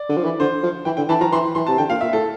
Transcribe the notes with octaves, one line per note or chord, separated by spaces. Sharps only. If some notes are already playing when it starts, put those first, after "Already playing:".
Already playing: D5
D3
F3
E3
D3 C5
F3
E3 G5
D3 G5
E3 A5
F3 A#5
E3 C6
E3 C6
C3 A5
D3 G5
A#2 F5
A#2 E5
A2 A4